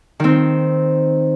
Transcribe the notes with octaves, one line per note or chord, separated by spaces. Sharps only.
D#3 C4